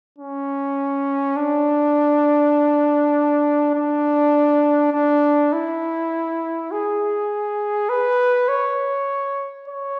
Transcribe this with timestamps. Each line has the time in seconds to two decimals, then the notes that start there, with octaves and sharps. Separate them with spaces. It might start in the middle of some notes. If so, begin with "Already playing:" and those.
0.18 C#4
1.36 D4
3.74 D4
4.92 D4
5.53 E4
6.71 G#4
7.89 B4
8.48 C#5
9.68 C#5